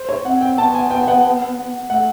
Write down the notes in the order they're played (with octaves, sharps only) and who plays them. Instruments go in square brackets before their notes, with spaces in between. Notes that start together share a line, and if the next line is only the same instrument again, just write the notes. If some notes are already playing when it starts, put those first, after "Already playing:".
Already playing: [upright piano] C5
C#5
[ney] C4 [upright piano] F#5
[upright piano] G5
[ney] B3 [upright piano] A5
[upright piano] G#5
G5
G5
F#5
[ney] A3 [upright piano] F#5